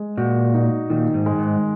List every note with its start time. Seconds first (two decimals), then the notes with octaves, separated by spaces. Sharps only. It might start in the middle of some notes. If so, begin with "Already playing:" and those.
Already playing: G#3
0.17 A#2 F#4
0.54 D#4
0.90 A#2 D#3
1.14 G#2
1.26 G#3
1.38 G#2